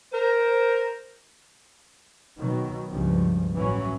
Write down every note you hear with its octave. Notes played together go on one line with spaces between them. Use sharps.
A#4 C5
B2 D#3 F#3
C#2 G2 F3
A1 E3 F#3 C#4